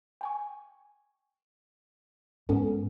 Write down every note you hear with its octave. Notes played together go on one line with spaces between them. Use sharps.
G5 G#5 C#6
G#2 B3 C#4 A4